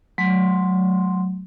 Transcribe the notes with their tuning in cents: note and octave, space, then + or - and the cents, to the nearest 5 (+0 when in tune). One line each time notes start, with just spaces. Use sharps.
F#3 +0 A3 -30 C6 +0